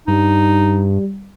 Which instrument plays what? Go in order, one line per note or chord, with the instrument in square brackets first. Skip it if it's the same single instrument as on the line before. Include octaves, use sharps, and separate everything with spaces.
[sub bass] G2 [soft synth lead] G3 [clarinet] D#4